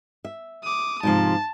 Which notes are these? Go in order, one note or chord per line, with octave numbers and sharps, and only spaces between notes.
E5
D6 D#6
G#2 C3 F3 A5